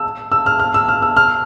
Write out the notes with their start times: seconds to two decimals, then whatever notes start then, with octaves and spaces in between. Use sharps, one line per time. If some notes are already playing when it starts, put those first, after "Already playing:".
Already playing: E6
0.32 E6
0.46 F6
0.59 F6
0.74 E6
0.88 F6
1.02 E6
1.17 F6